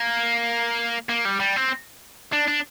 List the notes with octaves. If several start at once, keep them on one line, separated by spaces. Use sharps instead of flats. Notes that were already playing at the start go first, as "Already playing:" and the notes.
Already playing: A#3
A#3
G3
G3
C4
D4
D4